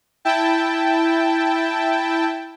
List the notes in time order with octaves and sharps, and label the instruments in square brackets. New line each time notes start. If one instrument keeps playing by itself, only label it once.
[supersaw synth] E4 G5 A5